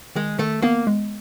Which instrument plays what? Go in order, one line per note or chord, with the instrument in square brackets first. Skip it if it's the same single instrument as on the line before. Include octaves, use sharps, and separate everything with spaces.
[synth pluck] D#3 [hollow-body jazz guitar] G#3
[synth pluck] D#3 [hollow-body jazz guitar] A3
[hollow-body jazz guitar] A#3 [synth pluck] B3
[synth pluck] G#3